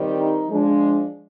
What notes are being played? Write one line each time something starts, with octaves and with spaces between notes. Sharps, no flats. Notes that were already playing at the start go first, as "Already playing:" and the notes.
Already playing: D#3 G3 C4
D#4
F3 G#3 D4